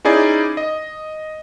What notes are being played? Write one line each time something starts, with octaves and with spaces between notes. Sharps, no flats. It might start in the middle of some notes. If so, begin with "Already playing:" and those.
C#4 D#4 E4 G#4 D5
D#5